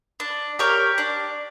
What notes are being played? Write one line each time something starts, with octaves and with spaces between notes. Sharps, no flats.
D4
G4 A#4 C#5
D4